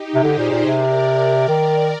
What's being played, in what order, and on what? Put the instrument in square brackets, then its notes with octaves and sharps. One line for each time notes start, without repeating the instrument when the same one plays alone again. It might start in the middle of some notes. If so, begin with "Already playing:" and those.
Already playing: [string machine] D#4 G4
[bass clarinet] C3
[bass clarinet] D3 [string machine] G#4 C5
[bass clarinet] A#2
A#2
[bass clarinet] C3 [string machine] A#4 D5
[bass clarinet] D#3